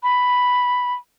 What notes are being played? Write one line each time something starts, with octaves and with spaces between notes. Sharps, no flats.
B5